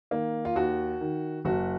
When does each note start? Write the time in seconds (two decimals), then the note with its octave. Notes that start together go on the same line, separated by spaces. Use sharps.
0.11 D#3 A#3
0.45 F4
0.56 D#2 F#4
1.01 D#3
1.45 F#1 F#4